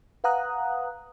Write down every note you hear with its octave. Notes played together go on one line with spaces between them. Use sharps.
B4 F5 F#5 A#5 D#6 F#6